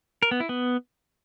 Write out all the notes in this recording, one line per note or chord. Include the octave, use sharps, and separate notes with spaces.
A#4
B3
E4
B3